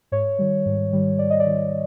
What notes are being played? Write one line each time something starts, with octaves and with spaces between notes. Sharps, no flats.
G#2 C#5
D#3 G3
G#2
D#3 G3
G#2 D5
D#5
D5
D#3 G3